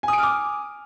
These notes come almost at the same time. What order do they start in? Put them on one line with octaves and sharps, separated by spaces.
G#5 D#6 D7 F6 D6